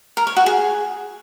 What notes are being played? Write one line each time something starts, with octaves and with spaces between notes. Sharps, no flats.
A#4
C#5
F#4
G#4